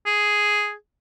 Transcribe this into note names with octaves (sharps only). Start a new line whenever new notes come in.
G#4